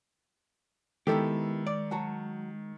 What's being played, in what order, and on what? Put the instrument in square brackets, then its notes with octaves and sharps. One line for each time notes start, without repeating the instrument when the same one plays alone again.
[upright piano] D#3 E6 [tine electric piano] G#3 [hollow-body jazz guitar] B3 E4 G4 [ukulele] A4
[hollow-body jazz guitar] D5
[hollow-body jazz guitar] F#3 F#4 [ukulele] A5